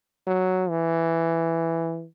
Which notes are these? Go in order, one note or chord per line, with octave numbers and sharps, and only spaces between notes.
F#3
E3